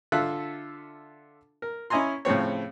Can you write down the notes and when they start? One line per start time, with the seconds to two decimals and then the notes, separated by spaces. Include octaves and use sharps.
0.12 D3 F4 A4 E5 E6 F#6
1.62 A#4
1.90 C#4 E4 D#5 G#5 A#5 C6
2.25 A2 C#3 F3 C4 C#5